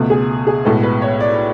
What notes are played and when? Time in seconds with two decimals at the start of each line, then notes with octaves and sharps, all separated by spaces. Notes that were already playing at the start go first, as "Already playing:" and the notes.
Already playing: C#2 B2 A3
0.10 G#4
0.47 G#4
0.65 B1 A2 G#3 B3 A4
0.83 B4
1.02 C#5
1.20 D5